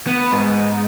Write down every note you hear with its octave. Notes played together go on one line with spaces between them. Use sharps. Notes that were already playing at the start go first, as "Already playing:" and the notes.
B3
G#2